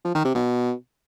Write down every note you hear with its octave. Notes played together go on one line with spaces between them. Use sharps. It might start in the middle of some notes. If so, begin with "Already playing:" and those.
F3
D#3
C3
B2